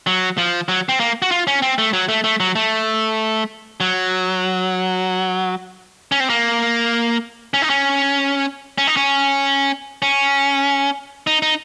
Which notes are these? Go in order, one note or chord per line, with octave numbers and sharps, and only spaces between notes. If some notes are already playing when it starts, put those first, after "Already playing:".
F#3
F3
F#3
C4
A#3
F#4
F4
C#4
C4
A3
F#3
A3
A3
F#3
A3
F#3
C#4
C4
A#3
C#4
D#4
C#4
C#4
D#4
C#4
C#4
D#4
D#4